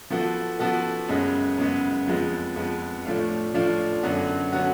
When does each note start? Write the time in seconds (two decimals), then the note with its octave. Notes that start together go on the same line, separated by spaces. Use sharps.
0.10 F3 B3 F#4 A4
0.59 F3 B3 F#4 A4
1.08 F#2 C#3 G#3 B3
1.58 F#2 C#3 G#3 B3
2.06 F2 F3 G#3 B3
2.56 F2 F3 G#3 B3
3.05 A2 F3 A3 D4 F4
3.54 A2 F3 A3 D4 F4
4.03 F#2 D3 F#3 B3 F#4
4.53 D3 F#3 B3 F#4